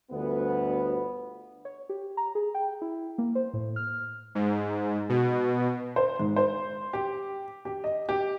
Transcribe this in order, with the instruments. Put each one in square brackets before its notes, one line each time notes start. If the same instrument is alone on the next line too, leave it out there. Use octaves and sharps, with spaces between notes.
[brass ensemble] G1 D2 B3
[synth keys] C#5
G4
A#5
G#4
G5
E4
A#3
C5
A2
F6
[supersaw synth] G#2
B2
[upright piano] C5
G#2
C5
G4
G4
D#5
G4